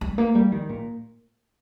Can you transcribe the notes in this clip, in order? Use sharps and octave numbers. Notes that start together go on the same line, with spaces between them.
G3
A#3
G3
D#3
A#2